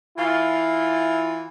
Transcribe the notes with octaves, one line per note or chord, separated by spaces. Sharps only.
E3 E4 F4